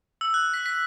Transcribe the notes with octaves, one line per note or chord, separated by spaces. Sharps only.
E6
F#6
B6
B6